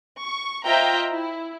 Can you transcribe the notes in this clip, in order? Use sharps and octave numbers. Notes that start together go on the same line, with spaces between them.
C#6
F4 C5 D#5 E5 G5 A#5
E4